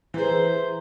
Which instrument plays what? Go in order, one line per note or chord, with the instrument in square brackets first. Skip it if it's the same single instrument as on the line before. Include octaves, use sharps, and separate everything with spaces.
[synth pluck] E3 [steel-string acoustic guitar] G#4 E5 [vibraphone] B4 A#5 C6 [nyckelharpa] C5